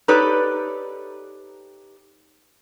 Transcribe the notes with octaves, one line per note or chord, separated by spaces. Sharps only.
D#4 G4 A4 B4 C#5 D5